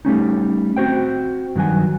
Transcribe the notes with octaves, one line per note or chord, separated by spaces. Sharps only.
G3 A3 C#4 D#4
C4 F#4 C5 G5
G2 D#3 F#3 F#4 G#5